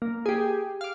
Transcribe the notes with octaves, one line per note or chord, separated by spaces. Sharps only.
A#3
G4 G#4
F5 D6